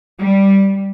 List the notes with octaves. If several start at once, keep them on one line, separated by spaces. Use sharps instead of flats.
G3